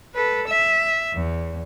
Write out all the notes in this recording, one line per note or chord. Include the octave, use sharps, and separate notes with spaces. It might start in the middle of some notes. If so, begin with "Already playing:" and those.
A4 B4
E5
E2